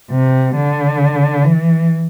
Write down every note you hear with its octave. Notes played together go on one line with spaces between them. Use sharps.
C3
D3
E3